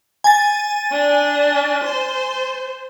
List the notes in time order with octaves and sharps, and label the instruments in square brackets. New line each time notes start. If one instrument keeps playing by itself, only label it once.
[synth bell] G#5 A6
[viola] D4
C5